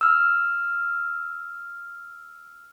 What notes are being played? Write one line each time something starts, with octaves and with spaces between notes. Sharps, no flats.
E6 F6